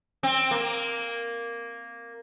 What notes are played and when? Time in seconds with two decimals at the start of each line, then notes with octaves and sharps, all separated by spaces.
0.23 C4
0.51 A#3